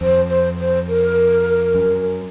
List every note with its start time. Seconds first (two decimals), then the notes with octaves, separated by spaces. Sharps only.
0.01 F2 C5
0.29 C5
0.60 C5
0.88 A#4
1.75 F#2